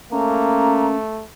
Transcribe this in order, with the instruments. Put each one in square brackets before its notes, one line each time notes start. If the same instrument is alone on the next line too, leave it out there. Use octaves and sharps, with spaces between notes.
[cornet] A3 [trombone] A#3 [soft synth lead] C#4 [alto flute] A#5